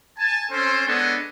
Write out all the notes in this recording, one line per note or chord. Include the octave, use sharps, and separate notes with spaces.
G#5 A5
C4 C#4 A4 C5
G#3 B3 D4 A4 C#5 D#5